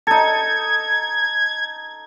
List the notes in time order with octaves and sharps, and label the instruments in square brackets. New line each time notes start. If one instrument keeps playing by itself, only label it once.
[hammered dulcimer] D#4 A4 [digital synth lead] G#6